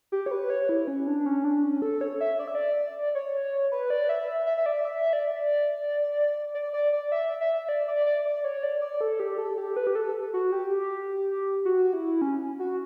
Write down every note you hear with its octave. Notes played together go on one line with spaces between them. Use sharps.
G4
C#5
B4
C#5
E4
C#4
D4
C#4
D4
C#4
A4
C#5
E5
D5
E5
D5
C#5
B4
D5
E5
E5
E5
E5
D5
E5
D5
D5
D5
D5
E5
E5
D5
D5
D5
D5
C#5
D5
D5
A4
G4
A4
G4
B4
G4
A4
F#4
G4
F#4
E4
C#4
F#4